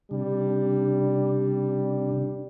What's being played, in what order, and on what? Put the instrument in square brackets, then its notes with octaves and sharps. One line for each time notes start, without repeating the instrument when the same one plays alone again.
[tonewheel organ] C3 D4 [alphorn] G3